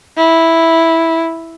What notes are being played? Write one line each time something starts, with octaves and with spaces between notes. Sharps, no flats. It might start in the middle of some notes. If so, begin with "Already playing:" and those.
E4